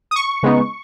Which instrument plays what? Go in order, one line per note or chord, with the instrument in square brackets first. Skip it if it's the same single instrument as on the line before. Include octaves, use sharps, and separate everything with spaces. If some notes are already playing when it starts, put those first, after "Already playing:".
[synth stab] D#6
C#6
C#3 G#3 B3 D#4